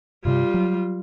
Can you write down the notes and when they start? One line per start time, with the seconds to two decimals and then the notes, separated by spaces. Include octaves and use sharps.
0.25 G2 C3 G3 F4
0.54 F#3